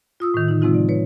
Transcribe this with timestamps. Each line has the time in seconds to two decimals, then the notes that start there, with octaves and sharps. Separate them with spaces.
0.20 F4 D#6 E6
0.34 A2 D#3
0.48 D3 D#4
0.61 C3 F3 G#3 C4 D#4 F4
0.74 D5
0.89 B4 C#5